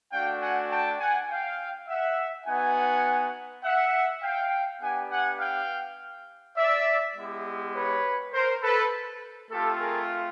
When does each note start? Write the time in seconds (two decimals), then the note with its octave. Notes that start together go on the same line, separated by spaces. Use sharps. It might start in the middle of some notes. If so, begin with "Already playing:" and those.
0.12 A3 D4 F#4 F5 G5
0.41 F#5 G#5
0.71 G5 A5
1.00 F#5 G#5
1.29 F5 G5
1.88 E5 F#5
2.47 B3 D#4 F#4 F#5 G#5
3.64 E5 F#5
4.23 F5 G5
4.82 B3 D4 G4 F#5 G#5
5.11 F#5 G#5
5.40 F5 G5
6.57 D5 E5
7.16 G#3 B3 E4 G4
7.75 B4 C#5
8.33 A#4 C5
8.62 A4 B4
9.51 A3 C4 F4 G4 A4
9.80 G#4 A#4